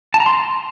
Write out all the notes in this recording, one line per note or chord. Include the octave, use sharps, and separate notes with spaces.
A5
A#5
C6